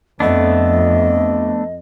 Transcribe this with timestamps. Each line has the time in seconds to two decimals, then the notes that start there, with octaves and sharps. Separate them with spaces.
0.20 F2 A3 B3 D4 D#5